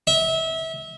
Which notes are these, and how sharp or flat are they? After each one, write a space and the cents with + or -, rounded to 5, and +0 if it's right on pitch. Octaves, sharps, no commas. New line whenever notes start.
E5 -25